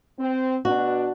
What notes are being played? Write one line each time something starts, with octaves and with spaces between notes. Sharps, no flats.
C4
B2 D4 F#4